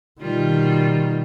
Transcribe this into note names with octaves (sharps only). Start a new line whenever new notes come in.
B2 D#3 G3 F4